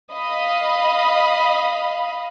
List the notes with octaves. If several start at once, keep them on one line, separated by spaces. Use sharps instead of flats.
D#5 F5 B5